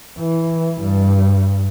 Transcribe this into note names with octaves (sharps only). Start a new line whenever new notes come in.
E3
G2